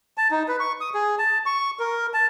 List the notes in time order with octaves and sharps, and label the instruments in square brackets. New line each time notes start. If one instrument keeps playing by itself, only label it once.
[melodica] A5
D#4
B4
C#6
D#6
G#4
A5
C#6
A#4
A5